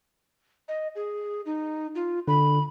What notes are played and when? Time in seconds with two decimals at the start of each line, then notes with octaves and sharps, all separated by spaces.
0.68 D#5
0.96 G#4
1.46 D#4
1.95 F4
2.28 D3 B5